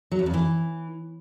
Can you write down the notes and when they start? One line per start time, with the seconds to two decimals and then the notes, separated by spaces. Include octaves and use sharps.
0.11 F#3
0.19 E2
0.26 F2
0.34 E3